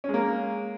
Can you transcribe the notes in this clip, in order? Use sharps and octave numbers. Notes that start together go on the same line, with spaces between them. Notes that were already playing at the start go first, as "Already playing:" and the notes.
G#3 A#3 C#4